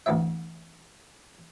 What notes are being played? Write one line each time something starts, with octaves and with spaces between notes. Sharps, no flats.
A1 D2 B3 C4 E5